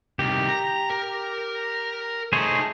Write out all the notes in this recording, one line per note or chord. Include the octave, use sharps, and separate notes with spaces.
C2 D#3 G4
A#5
A#4
A3 D#4 G#4 C5 C#5